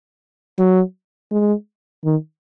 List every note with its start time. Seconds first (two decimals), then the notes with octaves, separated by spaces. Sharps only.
0.58 F#3
1.31 G#3
2.05 D#3